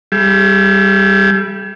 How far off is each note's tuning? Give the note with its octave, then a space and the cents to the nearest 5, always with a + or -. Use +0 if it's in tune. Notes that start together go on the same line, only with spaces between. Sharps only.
G3 +0 G#4 +35 E5 +30